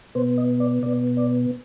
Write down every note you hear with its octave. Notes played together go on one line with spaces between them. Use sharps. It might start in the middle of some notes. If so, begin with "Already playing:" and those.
B2 B3 C5
D#5
D5
B2 B3 D5
D5